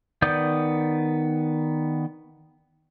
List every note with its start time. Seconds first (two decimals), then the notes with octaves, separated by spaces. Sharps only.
0.22 D#3 B3 D5 D#6 G6